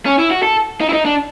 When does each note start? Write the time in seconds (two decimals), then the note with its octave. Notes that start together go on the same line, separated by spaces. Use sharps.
0.06 C#4
0.19 E4
0.31 F#4
0.42 A4
0.81 D#4
0.89 E4
0.93 D#4
1.05 D4